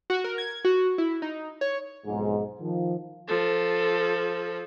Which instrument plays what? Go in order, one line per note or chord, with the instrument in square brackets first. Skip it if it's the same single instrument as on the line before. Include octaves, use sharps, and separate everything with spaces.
[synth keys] F#4
A#4
G#6
F#4
E4
D#4
C#5
[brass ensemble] B1 F2 G#2
D#3 F3
[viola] F3 A4